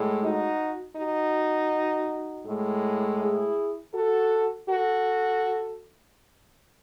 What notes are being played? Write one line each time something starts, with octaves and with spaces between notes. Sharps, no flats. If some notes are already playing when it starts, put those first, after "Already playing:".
Already playing: A2 G#3
D#4 F#4
D#4 F#4
A2 G#3
E4 G#4
F#4 A4
F#4 A4